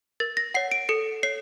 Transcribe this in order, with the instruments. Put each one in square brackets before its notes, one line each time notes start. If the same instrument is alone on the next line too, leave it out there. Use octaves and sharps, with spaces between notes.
[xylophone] A#4 A6
A#6
C#5 F#5 C7
D7
A4 C#7
C#5 C7